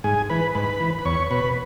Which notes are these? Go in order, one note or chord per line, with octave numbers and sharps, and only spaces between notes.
G#2 G#4 G#5
E3 B4 B5
G#2 B4 B5
E3
B5
E2 C#5 C#6
B2 B4 B5